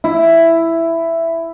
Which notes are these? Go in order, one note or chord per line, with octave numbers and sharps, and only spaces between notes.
E4